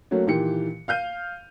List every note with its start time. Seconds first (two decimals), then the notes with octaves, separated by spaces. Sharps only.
0.11 F#3 A3 A#3 C#4 F#4
0.27 A#2 D#3 E3 G4 C#7
0.88 F5 F6 G6 D#7